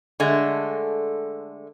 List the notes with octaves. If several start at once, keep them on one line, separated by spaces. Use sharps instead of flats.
D3 G#3 A3